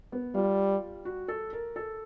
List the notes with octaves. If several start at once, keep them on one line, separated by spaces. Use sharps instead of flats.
B3
G3 F4
F#4
A4
A#4
A4